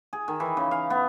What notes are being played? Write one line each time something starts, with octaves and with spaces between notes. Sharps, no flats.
G#4
D#3
E3
C#3
F5
B3